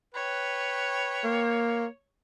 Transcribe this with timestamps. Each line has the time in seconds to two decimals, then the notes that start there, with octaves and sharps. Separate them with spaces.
0.14 B4 C#5 G5
1.24 A#3